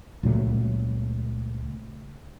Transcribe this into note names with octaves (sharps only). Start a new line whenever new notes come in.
C#2 A#2 F#3 A3